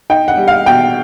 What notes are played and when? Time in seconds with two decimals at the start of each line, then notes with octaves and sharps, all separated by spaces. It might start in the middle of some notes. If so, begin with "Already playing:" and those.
0.10 D#4 G5
0.28 F#5
0.37 G3
0.48 F5
0.66 B2 G5